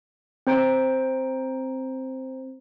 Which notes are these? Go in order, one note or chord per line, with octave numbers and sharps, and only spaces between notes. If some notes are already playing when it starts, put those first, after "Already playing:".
C4 C5 A#5 D7